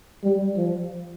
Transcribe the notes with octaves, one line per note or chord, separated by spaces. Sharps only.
G3
F3